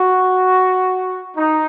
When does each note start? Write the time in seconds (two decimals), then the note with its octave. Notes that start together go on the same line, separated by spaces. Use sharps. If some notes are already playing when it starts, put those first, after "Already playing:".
Already playing: F#4
1.36 D#4